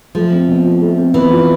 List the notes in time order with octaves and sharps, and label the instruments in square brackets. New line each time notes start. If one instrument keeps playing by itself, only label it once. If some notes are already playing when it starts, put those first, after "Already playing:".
[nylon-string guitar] F3 [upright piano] A3
[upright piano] C4
B2
F4
A3
C4
[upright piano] B2 [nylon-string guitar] E3
[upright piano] F4